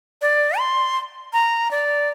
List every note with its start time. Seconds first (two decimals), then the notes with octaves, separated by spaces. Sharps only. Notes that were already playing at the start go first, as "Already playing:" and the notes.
0.22 D5
0.59 C6
1.33 A#5
1.71 D5